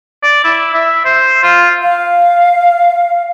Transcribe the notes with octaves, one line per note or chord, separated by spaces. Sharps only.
D5
E4
E5
C5
F4
F5